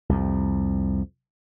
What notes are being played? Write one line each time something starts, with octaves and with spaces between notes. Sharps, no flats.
C2 F2